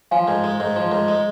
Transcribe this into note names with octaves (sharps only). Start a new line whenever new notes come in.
F3 F5 G#5
G#2
G#3
G#2
F3
G#2
G#3